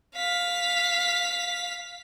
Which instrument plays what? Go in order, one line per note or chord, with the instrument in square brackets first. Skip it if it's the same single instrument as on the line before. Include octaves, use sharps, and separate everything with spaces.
[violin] F5 B6